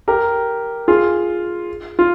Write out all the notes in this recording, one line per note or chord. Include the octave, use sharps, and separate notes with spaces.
G4 A#4
F4 G#4
F4